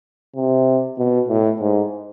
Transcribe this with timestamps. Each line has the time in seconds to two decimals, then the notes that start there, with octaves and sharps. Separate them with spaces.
0.36 C3
0.98 B2
1.29 A2
1.61 G#2